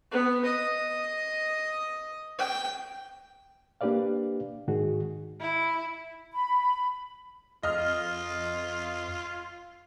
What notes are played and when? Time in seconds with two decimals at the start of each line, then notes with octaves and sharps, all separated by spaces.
0.11 B3
0.45 D#5
2.39 G5
3.81 A#3 D4 G4 B4 D5 F5
4.68 G#2 D#3 F#4 G#4
5.40 E4
6.33 B5
7.63 F2 F4 D#5 F6